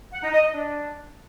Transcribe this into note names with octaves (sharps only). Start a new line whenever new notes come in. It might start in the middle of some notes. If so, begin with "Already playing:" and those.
F#5
D#4
D#5
D#5
D4